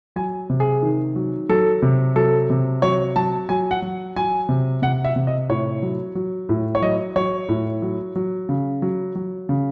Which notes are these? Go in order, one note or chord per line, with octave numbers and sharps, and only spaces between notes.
F#3 G#5
C3
G#4
D#3
F#3
F#3 A4
C3
F#3 A4
C3
F#3 C#5
F#3 A5
F#3 G#5
F#5
F#3
F#3 G#5
C3
C3 F#5
E5
C3
D#5
A2 C#5
F#3
F#3
A2
C#5
F#3 D#5
F#3 C#5
A2
F#3
F#3
C#3
F#3
F#3
C#3